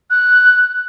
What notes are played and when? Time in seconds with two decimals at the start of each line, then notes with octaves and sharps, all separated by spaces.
0.10 F#6